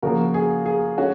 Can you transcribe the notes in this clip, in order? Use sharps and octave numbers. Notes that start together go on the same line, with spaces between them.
C#3 F3 A#3 F#4 A#4
G#4
G#4
G#3 C#4 F#4